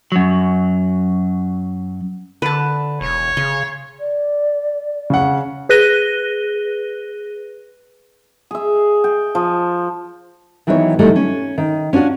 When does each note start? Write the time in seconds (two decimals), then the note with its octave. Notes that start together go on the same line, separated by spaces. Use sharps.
0.12 F#2 F#3
2.42 D3 B4 A5
3.01 E1 C#5
3.37 C#3 C6
4.00 D5
5.10 C#3 F#5
5.69 G#4 B4 F#6 A#6 D#7 G7
8.51 G#4 E5
9.04 G5
9.35 F3
10.67 D#3 E3 F#3 B3 D#4 C#5
10.99 D#3 E3 F#3 G3 A3
11.16 C#4
11.58 D#3
11.93 C#4 D4 F4 F#4